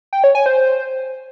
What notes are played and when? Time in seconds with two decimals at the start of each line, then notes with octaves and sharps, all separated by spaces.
0.13 G5
0.24 C#5
0.35 G#5
0.46 C5